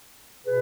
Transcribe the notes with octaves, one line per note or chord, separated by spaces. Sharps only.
B2 G#4 B4